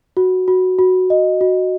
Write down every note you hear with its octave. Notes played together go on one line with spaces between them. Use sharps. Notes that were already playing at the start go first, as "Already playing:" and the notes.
F#4
F#4
F#4
D#5
F#4